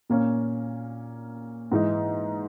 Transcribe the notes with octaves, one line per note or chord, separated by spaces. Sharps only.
A#2 A#3 C#4
G#2 E3 G#3 D#4